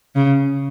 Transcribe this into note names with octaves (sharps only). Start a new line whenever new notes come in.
C#3